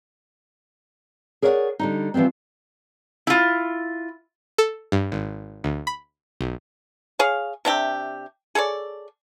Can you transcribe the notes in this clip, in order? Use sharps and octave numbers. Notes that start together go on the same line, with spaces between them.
G#4 A#4 C#5 D5 E5 F#5
D3 G3 D#4
E3 F3 G3 B3 C4
E4 F4
A4
G2
G#1
D2
B5
B1
G#4 C#5 F5
C3 D4 G4 E5
G#4 A4 C#5 D5